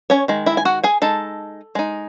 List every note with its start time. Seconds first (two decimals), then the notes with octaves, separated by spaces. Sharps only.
0.10 C#4 C#5
0.28 D#3 G#3
0.46 E4 E5
0.57 G#5
0.65 F#4 F#5
0.84 G#4 G#5
1.02 G#3 D#4 A4 A5
1.75 G#3 D#4